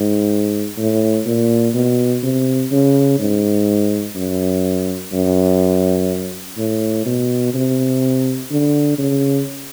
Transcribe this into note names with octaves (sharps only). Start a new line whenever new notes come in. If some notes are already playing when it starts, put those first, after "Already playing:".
Already playing: G#2
A2
A#2
B2
C3
C#3
G#2
F#2
F#2
A2
B2
C3
D3
C#3